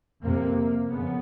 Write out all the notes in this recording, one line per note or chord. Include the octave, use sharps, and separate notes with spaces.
F2 C3 A#3
F2 C#3 B3